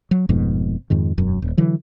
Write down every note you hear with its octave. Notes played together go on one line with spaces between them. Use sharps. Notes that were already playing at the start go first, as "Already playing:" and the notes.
F#3
F1 F2 G#2 B2
F2 G#2 D#3
E1 F#2
D#1
D3 E3 F#3